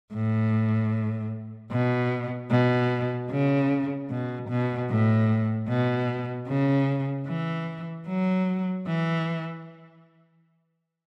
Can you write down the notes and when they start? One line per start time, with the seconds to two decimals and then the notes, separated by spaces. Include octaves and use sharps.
0.14 A2
1.71 B2
2.51 B2
3.31 C#3
4.10 B2
4.50 B2
4.90 A2
5.69 B2
6.48 C#3
7.27 E3
8.07 F#3
8.87 E3